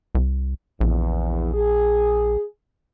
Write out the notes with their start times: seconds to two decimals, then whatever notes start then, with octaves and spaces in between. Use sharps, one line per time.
0.15 C2
0.81 A#1 E2
1.54 G#4